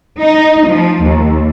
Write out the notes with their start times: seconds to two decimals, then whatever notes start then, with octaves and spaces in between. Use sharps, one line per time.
0.19 D#4
0.67 F3
1.02 D#2